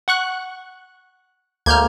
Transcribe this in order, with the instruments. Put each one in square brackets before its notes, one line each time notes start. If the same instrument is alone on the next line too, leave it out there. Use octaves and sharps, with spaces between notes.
[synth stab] F#5 C#6 F#6
[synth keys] D2 [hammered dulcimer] G#3 A#3 [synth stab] F6 G6 G#6